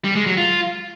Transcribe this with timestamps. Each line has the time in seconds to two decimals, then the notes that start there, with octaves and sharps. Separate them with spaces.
0.04 G3
0.15 G#3
0.26 F#3
0.37 F4